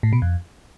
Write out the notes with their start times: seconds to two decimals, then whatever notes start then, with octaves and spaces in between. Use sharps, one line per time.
0.03 A2
0.13 B2
0.22 F2